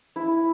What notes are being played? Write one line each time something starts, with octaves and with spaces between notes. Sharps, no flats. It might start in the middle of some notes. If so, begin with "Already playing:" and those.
E4